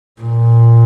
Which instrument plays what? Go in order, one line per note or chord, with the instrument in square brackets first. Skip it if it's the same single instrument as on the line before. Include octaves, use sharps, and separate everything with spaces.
[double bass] A#2